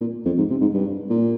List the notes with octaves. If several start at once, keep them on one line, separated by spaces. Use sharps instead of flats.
A#2
F2
G#2
C3
G#2
G2
A#2